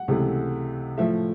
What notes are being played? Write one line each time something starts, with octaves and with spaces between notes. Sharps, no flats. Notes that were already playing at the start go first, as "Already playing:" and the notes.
Already playing: F#5
C#2 C3 E3 A3
A2 F3 A3 E5